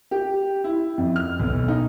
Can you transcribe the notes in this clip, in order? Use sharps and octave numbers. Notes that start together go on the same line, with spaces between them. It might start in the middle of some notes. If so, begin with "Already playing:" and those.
G4
E4
F2
F6
B1
D#4